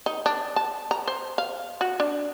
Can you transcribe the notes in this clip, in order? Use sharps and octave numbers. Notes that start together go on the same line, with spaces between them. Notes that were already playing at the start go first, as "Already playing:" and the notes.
D#4
D4
A5
A#5
C5
F5
F#4
D4